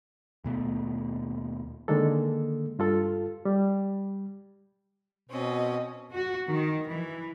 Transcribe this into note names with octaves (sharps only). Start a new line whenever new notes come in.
D#2 B2 A3 B3
D3 D#3 G#3 A#3 A4
G2 F4 A4
G3
B2 C4 C#4 D#5
F#4
D#3
E3